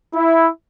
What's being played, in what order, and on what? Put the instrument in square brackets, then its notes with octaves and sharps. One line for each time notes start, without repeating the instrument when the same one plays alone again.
[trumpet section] E4